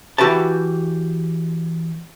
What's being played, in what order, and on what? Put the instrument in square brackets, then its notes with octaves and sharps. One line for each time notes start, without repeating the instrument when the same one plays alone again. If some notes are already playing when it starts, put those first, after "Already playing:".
[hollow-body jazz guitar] E3 F#4 G4 B4 A5